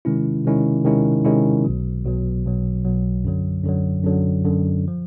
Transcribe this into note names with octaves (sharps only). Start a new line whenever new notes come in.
C3 D#3 G#3 C#4 E4
C3 D#3 G#3 C#4 E4
C3 D#3 G#3 C#4 E4
C3 D#3 G#3 C#4 E4
B1 B2 F#3
B1 B2 F#3
B1 B2 F#3
B1 B2 F#3
F#2 D3 F#3
F#2 D3 F#3
F#2 D3 F#3
F#2 D3 F#3
F3